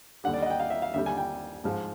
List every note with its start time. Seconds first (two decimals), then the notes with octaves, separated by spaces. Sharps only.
0.24 D#2 D3 G3 F#5
0.34 D5
0.42 D#5
0.46 F#5
0.50 G5
0.60 F5
0.70 E5
0.82 F5
0.94 D#2 D3 G3 E5
1.06 G#5
1.17 G5
1.64 G#2 F3 G#3